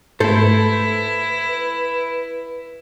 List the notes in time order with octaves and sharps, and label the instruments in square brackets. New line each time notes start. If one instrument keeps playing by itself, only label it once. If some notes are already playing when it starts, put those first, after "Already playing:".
[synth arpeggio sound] G#2 A3 [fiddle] E4 [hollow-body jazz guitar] A4 C5 [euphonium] B4